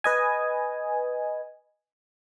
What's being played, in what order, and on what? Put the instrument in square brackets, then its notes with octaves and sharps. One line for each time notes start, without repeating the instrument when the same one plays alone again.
[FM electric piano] B4 D#5 G#5